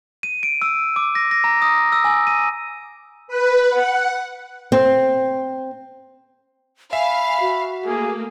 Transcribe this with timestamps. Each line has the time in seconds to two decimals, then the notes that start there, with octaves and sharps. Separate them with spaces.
0.23 D#7
0.43 D7
0.62 E6
0.96 D6
1.15 A#6
1.31 A#6
1.44 A#5
1.62 D#6
1.92 E6
2.04 G#5
2.27 D#7
3.28 B4
3.70 F#5
4.72 C4
6.93 E5 F5 G#5 B5
7.40 F#4
7.86 A3 A#3 G#4